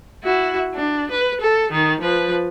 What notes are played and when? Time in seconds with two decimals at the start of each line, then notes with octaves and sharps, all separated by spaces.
0.23 E4 F#4
0.75 D4
1.11 B4
1.41 A4
1.71 D#3
2.01 F3 B4